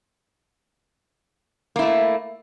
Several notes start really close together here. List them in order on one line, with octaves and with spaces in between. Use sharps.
A#3 E4 A3